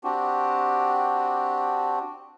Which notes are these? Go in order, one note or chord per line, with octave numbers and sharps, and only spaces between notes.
C4 D4 F#4 G4